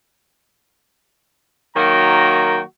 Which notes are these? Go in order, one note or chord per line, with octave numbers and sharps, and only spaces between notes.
D#3 F#3 A#3 F#4 G5 A#5